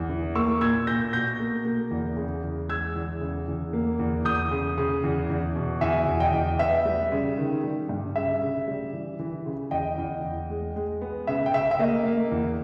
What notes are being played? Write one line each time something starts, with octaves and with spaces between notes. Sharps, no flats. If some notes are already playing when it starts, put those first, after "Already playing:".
Already playing: E2
E3
A#3 C#6 E6
A#2 E6 G#6
A#2 G6 A#6
B2 G6 A#6
A#3
A#3
E2
C#3
E2
G#3 E6 G#6
E2
C#3
E2
A#3
E2
E2 D#6 G6
C#3
C#3
E2
E2
B2
E2 E5 G#5
E2
D#5 G5
E2
B3 E5
G3
C#3
D#3
G3
G2
C#3 E5
C#3
G3
E3
E3
C#3
E2 D#5 G5
E2
E2
G#3
G#3
B3
C#3 E5
G5
C#3 E5
E5
A#3 D#5
A#3
E2